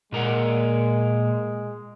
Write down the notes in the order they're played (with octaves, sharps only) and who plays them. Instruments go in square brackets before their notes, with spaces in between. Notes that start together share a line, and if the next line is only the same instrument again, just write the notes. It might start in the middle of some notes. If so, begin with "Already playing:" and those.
[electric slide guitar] A#2 A#4 F#5 [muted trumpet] G#3